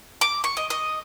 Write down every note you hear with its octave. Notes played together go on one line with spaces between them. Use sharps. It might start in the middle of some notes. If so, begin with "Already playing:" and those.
D6
C#6
D#5
D#5